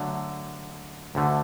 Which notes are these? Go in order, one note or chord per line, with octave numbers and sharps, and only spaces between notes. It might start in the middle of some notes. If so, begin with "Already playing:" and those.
Already playing: D3 F#3 A3
D2 D3 A3